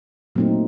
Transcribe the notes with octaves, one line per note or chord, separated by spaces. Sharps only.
A#2 F#3 A3 C4 D#4